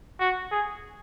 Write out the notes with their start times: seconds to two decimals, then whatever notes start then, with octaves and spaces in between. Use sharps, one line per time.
0.20 F#4
0.51 G#4